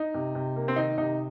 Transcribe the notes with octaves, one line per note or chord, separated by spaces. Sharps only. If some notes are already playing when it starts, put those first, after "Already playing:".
Already playing: D#4
C3
C3
A#3
C4
D#3 D#4
C3 D#4